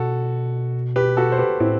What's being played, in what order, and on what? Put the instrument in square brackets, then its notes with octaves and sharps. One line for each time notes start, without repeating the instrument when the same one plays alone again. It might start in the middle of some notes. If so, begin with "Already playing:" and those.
Already playing: [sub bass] B2 [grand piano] F#4 A4
[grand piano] G4 B4
F#4 A4
C5
G4 B4
[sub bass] A2 [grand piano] C4 E4